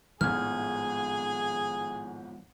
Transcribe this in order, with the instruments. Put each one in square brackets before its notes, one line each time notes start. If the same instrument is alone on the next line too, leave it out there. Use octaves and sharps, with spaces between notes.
[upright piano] G#1 A2 G#6 [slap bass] F3 G#3 B3 [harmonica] G#4 [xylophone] F6